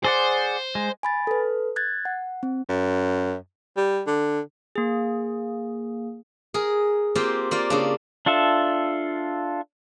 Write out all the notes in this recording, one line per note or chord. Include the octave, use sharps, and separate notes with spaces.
G#4 C5 D5 F#5
G#3
G#5 B5 A6
A4 B4
F#6 G#6 A6
F#5
C4
F#2
G3
D3
A#3 G#4
G#4 A#4
A#3 C4 F4 G4
A#3 F4 D5
C#3 A#3 D4
D4 F4 A4 E5